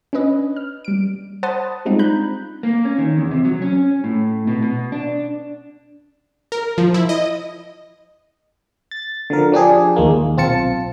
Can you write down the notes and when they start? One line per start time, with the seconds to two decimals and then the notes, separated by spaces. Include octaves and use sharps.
0.13 C#4 D4 B4 D#5
0.56 F6
0.85 G3 D7
1.43 C5 F#5 A5 B5 D#6 A6
1.85 G3 G#3 C4 D4 D#4 F4
1.99 A#5 B5 F#6 G6
2.63 A#3
2.85 C#4
2.98 D#3
3.18 E2
3.31 C3
3.45 F#3
3.62 C#4
4.04 A2
4.47 B2
4.62 B2
4.92 D4
6.52 A#4
6.78 F3
6.94 E4
7.09 D#5
8.91 A6
9.30 D3 F3 A#4
9.52 F3 D4 G4 G#4
9.96 D#2 G#3 A#3
10.14 D#2
10.37 B1 C4 F4 A5 C#7